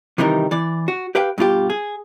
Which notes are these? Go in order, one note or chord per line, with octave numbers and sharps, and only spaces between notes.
C3 D#3 E3 G3 D#4 A#4
E3 D5
F#4
G4 B4 F5 G5
G2 B2 F4 G4
G#4